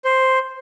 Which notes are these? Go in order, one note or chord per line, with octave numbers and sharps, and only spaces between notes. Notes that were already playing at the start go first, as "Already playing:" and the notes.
C5